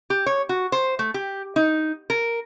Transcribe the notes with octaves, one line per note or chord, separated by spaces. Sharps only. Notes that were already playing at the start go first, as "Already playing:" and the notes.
G4
C#5
F#4
C5
A3
G4
D#4
A#4